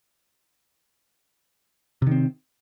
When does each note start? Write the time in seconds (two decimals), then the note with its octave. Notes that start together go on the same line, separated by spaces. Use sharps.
2.02 C3
2.07 D#3
2.11 C4